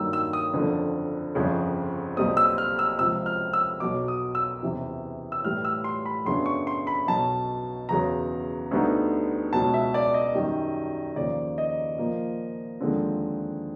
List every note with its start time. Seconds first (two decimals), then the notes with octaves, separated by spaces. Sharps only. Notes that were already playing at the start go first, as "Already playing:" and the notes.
Already playing: G2 D#3 F#3 A#3 D#4 E6
0.13 E6
0.33 D#6
0.53 F#1 F2 D3
1.35 G1 F2 C#3
2.16 B1 A#2 G3 C4 D#6
2.37 E6
2.58 F6
2.79 E6
2.98 C#2 C3 F3 E6
3.26 F6
3.53 E6
3.80 B1 B2 F#3 D6
4.08 D#6
4.35 E6
4.62 F#1 E2 C3 E3
5.32 E6
5.44 A2 E3 G3 F6
5.65 E6
5.84 C6
6.06 B5
6.25 F#2 C#3 F#3 B3 D4 C6
6.46 C#6
6.67 C6
6.87 B5
7.07 B1 B2 F#3 A5
7.89 F#1 E2 C#3 F#3 A#5
8.71 D2 D3 G3 B3 D#4
9.53 C#2 B2 F#3 A5
9.74 E5
9.94 D5
10.14 D#5
10.35 F#2 D#3 G3
11.16 D#2 C#3 F3 D5
11.58 D#5
11.98 A#2 F3 A#3
12.81 D#2 D3 F3 G#3 C4